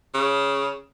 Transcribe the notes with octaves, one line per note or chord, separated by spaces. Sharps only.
C#3